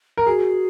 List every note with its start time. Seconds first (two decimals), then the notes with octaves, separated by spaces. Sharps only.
0.17 A#4
0.27 F#4 G#4